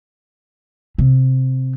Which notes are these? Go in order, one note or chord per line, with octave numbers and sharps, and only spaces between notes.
C3